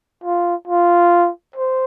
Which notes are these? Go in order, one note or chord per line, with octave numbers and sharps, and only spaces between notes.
F4
F4
C5